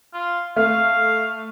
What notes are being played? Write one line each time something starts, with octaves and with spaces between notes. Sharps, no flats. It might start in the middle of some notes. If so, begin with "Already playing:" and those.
F4
A3 F5